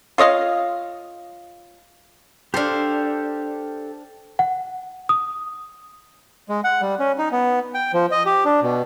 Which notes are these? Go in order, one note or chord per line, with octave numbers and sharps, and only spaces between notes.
F4 C#5 D#5 F5
D4 G4 A4 C5 F5
F#5
D#6
G#3
F#5
G3
C#4
D#4
B3
G5
F3
D#5
G4
D4
B2